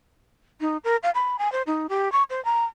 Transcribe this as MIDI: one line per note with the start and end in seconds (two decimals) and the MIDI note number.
0.61 0.77 63
0.84 0.96 70
1.03 1.10 77
1.15 1.36 83
1.39 1.51 80
1.52 1.62 72
1.67 1.87 63
1.89 2.11 67
2.12 2.23 85
2.30 2.43 72
2.45 2.64 82